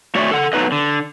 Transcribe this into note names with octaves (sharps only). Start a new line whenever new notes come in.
A3 F#4 C#5 D5 E5
A4 F#5
F#3 A3 B3 D#4 B4 D#5
D3